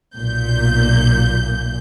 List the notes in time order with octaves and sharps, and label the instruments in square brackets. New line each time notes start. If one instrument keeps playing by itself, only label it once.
[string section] B1 A#2 G6